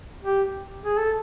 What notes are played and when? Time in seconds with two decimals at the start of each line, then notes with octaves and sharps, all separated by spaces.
0.24 G4
0.85 G#4
0.98 A4